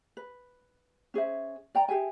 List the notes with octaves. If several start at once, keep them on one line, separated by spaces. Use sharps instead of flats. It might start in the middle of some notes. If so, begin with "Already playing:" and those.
B4
C#4 G#4 C5 E5
D5 G5 A#5
G4 G#4 E5 G#5